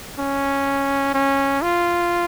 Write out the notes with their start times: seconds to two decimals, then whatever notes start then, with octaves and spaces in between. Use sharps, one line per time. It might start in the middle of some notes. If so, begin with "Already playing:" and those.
0.19 C#4
1.14 C#4
1.63 F4